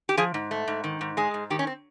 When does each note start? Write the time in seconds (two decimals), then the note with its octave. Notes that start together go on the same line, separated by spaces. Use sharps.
0.09 G4
0.17 F3 G#4
0.34 G#2
0.51 A3
0.68 G#2
0.84 D#3
1.01 G#2
1.17 G#3 G#4
1.34 G#2
1.50 D#3 G4
1.59 C#4
1.67 C4